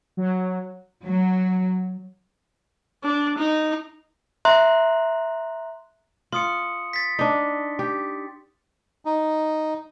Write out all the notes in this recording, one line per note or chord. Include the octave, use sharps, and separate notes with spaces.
F#3
F#3
D4
D#4
E5 A#5 C6 F#6
F4 C6 D#6 C#7
A6 B6
D4 D#4
G4
D#4